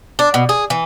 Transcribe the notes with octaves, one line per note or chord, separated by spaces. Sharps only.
D4
B2
G#4
E3